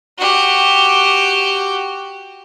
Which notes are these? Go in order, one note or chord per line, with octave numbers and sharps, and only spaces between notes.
F#4 G4